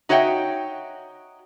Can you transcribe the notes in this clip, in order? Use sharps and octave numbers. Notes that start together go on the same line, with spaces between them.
D#4 F#4 C#5 E5 F5 G5